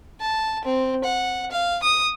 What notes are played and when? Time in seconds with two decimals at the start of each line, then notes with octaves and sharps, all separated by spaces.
0.20 A5
0.64 C4
1.04 F#5
1.51 F5
1.83 D#6